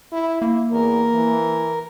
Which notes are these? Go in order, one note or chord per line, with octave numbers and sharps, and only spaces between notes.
E4
A#3 E4
E2 A#4
E3